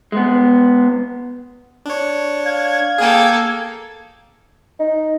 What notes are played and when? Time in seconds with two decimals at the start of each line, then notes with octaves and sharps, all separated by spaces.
0.12 G#3 B3
1.86 D4 C#5
2.46 F5 G#6
2.98 A#3 G#4 A4 G5
4.80 D#4